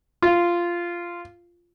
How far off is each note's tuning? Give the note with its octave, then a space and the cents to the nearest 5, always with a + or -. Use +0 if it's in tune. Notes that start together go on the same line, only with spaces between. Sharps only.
F4 -10